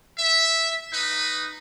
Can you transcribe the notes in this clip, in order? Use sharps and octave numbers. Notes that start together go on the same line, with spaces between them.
E5
D#4 B4